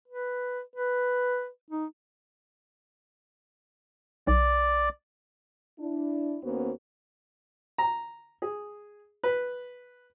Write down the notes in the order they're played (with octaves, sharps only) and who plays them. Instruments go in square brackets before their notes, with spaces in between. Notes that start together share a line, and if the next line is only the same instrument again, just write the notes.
[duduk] B4
B4
D#4
[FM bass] B1 [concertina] D5
[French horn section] D4 E4
D#2 A#3 B3 C#4 F#4 C5
[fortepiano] A#5
G#4
B4